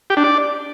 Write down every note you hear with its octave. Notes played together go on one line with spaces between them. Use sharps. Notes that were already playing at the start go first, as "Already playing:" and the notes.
G4
D4
D5